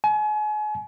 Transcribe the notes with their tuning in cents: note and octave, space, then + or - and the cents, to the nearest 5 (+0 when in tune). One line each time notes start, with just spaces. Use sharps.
G#5 +35